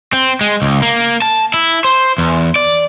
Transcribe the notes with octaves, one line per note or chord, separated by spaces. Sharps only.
C4
G#3
C#2
A#3
A5
E4
C5
E2
D5